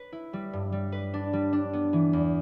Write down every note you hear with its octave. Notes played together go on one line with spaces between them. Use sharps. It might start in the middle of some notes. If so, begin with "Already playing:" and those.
Already playing: B4
E4
G3
G2
G3
B4
D4
G3
D4
B3
E3
E2